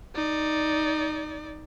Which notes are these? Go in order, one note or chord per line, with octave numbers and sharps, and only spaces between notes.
D#4 D5